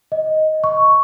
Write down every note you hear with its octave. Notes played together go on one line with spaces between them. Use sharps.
D#5
C#6